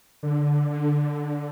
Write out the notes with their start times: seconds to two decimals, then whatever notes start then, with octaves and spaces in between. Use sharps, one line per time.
0.23 D3
0.70 D3